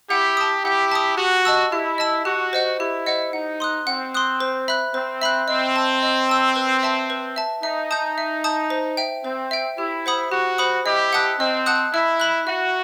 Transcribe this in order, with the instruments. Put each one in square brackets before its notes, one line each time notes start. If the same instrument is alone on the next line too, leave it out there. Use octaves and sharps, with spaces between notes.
[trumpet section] E4 G4 [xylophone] F#5
[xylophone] A5 D#6
[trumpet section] E4 G4 [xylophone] F#5
[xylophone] A5 D#6
[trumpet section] F#4 [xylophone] G4
[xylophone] D#5 A5 E6
[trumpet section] E4 [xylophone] G4
[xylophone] D#5 A5 E6
[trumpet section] F#4 [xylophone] G4
[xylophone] C5 D#5 F#5
[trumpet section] E4 [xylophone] G4
[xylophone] C5 D#5 F#5
[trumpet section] D#4 [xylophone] F#5
[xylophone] C6 D#6 F#6
[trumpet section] C4 [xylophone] F#5
[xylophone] C6 D#6 F#6
C5
E5 B5 F#6
[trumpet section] C4 [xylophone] C5
[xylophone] E5 B5 F#6
[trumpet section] C4 [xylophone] D#5
[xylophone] A5 E6
D#5
A5 E6
B4
E5 A5
B4
E5 A5
[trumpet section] D#4 [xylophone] E5
[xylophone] A5 D#6 G6
E5
A5 D#6 G6
C5
E5 G5
[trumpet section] C4 [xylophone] C5
[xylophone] E5 G5
[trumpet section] E4 [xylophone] G4
[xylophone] C5 F#5 B5 D#6
[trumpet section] F#4 [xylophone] G4
[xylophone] C5 F#5 B5 D#6
[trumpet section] E4 G4 [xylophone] D#5
[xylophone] F#5 A5 D#6 F#6
[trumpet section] C4 [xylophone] D#5
[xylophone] F#5 A5 D#6 F#6
[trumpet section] E4 [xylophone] E5
[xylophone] B5 F#6
[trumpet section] F#4 [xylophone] E5